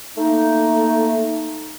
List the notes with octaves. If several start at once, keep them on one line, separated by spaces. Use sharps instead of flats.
A3 A#3 D#4